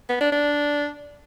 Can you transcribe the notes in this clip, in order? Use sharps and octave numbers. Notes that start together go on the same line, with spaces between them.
B3
D4
D4